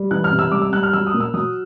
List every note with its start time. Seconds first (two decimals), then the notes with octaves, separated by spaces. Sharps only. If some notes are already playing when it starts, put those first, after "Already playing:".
Already playing: G3
0.11 E3 F#6
0.24 F6
0.31 C3
0.39 E6
0.52 G3 D6
0.62 E6
0.73 G3 F#6
0.83 F6
0.93 F#3 E6
1.07 D#6
1.14 A#2
1.20 E6
1.34 F#3 D#6